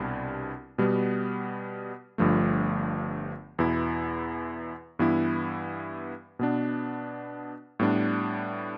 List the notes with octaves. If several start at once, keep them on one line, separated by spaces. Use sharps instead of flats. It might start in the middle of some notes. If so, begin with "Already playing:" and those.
Already playing: C2 B2 G3 D4
B2 G3 B3
G1 G2 F3 A3
E2 B2 B3 E4
G2 E3 B3 E4
B2 B3 D4
A2 G3 B3 D4